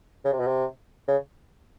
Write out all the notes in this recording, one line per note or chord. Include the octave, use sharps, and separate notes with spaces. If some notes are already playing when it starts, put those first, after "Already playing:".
C#3
C3
B2
C3
C#3